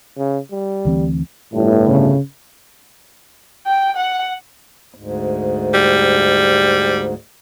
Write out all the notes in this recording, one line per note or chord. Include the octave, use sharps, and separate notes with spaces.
C#3
G3
D2 E3 C4
G1 A2
C#3
G5
F#5
D2 G#2
G3